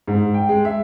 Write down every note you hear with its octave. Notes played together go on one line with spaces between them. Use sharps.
G#2
G5
G#3
E5